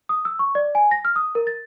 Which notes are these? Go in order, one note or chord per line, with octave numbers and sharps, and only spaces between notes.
D#6
E6
C#6
D5
G#5
A#6
F6
D#6
A#4
A6